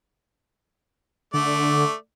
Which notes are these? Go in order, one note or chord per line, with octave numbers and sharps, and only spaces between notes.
D3 A3 D5